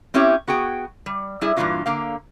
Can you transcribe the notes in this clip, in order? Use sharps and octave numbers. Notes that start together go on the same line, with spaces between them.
C4 C#4 E4 G4 C#5
B3 F#4 G#4 G5
G3
G3 E4 G#4
G2 A#2 D#3 E3 F4 F#4
D3 A#3 F5